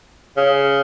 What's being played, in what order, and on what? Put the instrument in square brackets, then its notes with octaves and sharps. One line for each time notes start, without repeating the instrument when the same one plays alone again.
[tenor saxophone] C#3